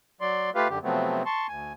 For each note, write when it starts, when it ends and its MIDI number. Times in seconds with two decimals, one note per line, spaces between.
0.21 0.50 54
0.21 0.50 74
0.21 0.50 84
0.55 0.68 57
0.55 0.68 65
0.55 0.68 67
0.55 0.68 71
0.55 0.68 77
0.69 0.79 42
0.69 0.79 50
0.69 0.79 67
0.84 1.23 48
0.84 1.23 53
0.84 1.23 54
0.84 1.23 57
0.84 1.23 59
0.84 1.23 60
1.26 1.47 81
1.26 1.47 84
1.26 1.47 85
1.49 1.73 38
1.49 1.73 80